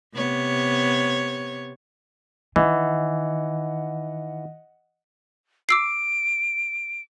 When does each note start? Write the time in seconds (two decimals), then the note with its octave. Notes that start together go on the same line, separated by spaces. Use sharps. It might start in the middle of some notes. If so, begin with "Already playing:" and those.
0.15 C3 B3 C#5
2.56 D#3 E3 D#5 F#5
5.69 D6 E6 C7 D7